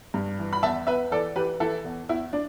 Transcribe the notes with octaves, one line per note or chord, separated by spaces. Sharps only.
G2
E3
B5
E2 E5 A5
E2 B4 E5
E3 A4 D5
E3 G4 B4
E3 E4 A4
E2
E2 E4
D4